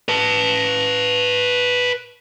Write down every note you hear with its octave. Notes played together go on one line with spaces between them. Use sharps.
B4 A5